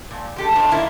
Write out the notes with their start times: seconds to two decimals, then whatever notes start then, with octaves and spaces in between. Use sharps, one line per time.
0.11 A#2
0.36 G#3 G4 A4
0.55 D#3 F3 A3 D4 C5 D5
0.71 B2 D3 A#3 E4 F4 A#4